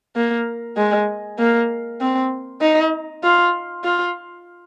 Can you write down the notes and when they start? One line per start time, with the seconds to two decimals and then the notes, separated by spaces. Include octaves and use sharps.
0.16 A#3
0.77 G#3
1.39 A#3
2.00 C4
2.61 D#4
3.23 F4
3.84 F4